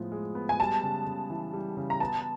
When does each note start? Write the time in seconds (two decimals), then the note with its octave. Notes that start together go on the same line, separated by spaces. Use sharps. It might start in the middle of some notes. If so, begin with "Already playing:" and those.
Already playing: A2 F3 G#3 B3
0.12 G#3
0.35 B3
0.49 G#5
0.59 G3 A5
0.83 C#3
1.07 C#3
1.30 E3
1.54 G3
1.77 C#3
1.90 A#5
2.00 B3 A5